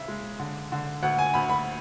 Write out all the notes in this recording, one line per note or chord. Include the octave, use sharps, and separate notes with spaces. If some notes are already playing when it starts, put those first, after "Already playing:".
Already playing: C#3 E5
G#3
D3
D3
D2 F#5
G#5
D2 B5
B5